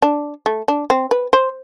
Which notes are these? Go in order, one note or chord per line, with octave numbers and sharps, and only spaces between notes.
D4
A3
D4
C4
B4
C5